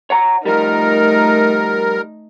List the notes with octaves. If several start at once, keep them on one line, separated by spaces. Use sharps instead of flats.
C#5 F#5 A#5
F3 G3 A3 D#4 A#4